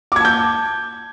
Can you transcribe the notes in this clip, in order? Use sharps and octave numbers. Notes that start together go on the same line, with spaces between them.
A5 D6 G6 G#6